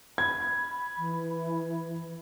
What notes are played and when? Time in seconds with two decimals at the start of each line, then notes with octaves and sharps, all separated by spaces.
0.18 B5 G#6
0.97 E3